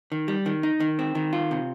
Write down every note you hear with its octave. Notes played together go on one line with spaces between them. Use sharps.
D#3
G3
D#3
D#4
D#3
C4
D#3
F4
C3